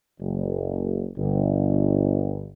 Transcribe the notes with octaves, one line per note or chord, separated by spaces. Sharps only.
F#1
G1